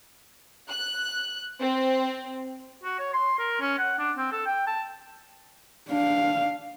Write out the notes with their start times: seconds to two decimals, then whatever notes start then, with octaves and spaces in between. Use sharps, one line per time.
0.69 F#6
1.61 C4
2.84 F#4
2.99 C#5
3.13 C6
3.38 A#4
3.61 C#4
3.79 F#5
3.99 D4
4.17 C4
4.32 A4
4.46 G5
4.67 A5
5.89 D4 F5